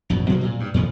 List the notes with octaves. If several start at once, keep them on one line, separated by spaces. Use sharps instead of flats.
A#1 F#2 B2
D2 B2 F#3 A#3
A#2
G2
F2 A#2 D#3 F3